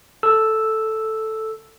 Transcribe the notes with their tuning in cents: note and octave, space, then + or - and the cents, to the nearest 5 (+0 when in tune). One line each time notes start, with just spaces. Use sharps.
A4 +0 E6 +0